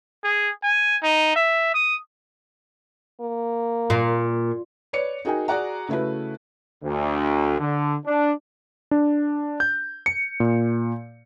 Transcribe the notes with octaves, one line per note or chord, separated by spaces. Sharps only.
G#4
G#5
D#4
E5
D#6
A#3
A#2
B4 C#5 D5 C#7
D#4 F#4 G#4 A#4 G5 G#5
F#4 G#4 D5 F#5 A#5
C#3 A3 E4 F#4 B4
D2
D3
D4
D4
G6
C#7
A#2